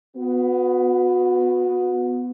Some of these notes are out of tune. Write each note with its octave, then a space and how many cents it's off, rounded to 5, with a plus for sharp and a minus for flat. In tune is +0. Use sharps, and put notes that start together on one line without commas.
B3 +15 F#4 -30